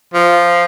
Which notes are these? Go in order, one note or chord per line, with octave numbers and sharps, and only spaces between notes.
F3